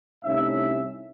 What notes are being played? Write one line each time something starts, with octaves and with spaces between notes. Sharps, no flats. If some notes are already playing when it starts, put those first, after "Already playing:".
C2 A2 C#4 D#4 E5